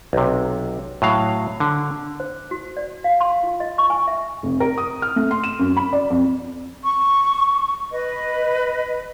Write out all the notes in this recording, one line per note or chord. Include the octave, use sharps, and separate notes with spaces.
B1 C3
A2 F#3 F5
D3
C5
F#4
D5
F5
C6
F4
D#5
C#6
G#5
E5
F1
A#4
D#6
F6
A3
C6
E7
F#2
B5
D5
F2
C#6
B4 D#5